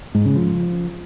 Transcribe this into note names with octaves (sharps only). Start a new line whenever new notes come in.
G#2
C#3
F3